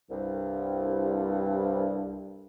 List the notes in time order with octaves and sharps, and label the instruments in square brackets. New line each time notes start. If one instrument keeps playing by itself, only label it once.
[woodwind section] C2 [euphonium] G2